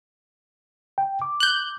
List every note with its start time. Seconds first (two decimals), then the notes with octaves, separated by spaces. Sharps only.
0.98 G5
1.22 D6
1.40 F#6 G6